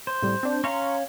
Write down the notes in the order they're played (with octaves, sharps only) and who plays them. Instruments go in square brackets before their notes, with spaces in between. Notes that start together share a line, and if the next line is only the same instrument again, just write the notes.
[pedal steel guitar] C5
[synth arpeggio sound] A2 C3 G3
C4 D4
[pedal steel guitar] C#4 F5 [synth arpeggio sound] A#5 C6 C#6